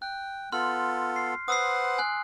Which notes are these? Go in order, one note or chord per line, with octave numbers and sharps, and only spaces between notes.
G5 F#6
B3 F4 A4 C6 F6
C7
B4 C5 F#5 D#6 E6 C7
G#5 C6 F#6